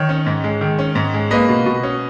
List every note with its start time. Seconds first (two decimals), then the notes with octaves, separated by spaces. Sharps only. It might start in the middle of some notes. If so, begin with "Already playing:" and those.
Already playing: D#3 C#5
0.09 C#4
0.26 G#2
0.44 G#3
0.61 D#3
0.79 C#4
0.95 G#2
1.14 G#3
1.31 A#3 B4 D#5
1.49 B2
1.66 B2
1.83 C#4